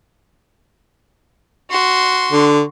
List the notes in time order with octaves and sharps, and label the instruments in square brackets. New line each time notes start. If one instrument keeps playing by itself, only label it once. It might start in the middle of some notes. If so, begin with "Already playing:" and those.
[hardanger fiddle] F#4 C6
[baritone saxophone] D3